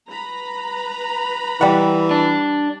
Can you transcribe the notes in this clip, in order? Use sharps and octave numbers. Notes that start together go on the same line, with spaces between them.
B4 A#5 B5
E3 G3 F#5
D4